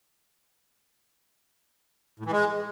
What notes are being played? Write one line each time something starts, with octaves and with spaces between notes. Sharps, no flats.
A2
E3
G#3